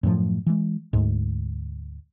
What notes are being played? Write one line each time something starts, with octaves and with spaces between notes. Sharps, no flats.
F#2 A2 F3
E3 G#3
D2 G#2